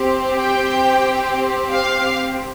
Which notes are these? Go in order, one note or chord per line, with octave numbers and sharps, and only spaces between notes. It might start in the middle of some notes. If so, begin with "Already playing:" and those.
Already playing: C4 G4
G5
F5